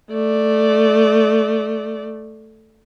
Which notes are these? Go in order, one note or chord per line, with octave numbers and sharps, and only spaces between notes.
A3 D5